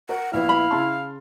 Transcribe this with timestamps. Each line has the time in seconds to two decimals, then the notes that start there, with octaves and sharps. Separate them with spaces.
0.09 A#4 F#5
0.33 A#1 B3 E4 F5
0.49 B5
0.71 C#3 A5 C6